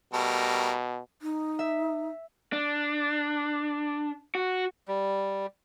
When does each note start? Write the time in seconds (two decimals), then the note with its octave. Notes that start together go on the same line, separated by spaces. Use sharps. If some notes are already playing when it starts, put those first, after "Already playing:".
0.13 B2 G3 A3 A#4
1.22 D#4
1.59 E5
2.53 D4
4.35 F#4
4.88 G3